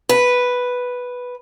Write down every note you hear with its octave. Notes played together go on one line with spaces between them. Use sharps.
B4